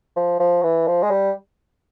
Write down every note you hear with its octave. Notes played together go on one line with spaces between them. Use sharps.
F3
F3
E3
F3
G#3
G3